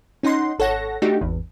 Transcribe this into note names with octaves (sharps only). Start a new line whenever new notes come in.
C#4 D#4 F#5 C6
G#1 A4 C#5 F#5 A#6
A3 D4 D#4 F#4 G4
G#1 E2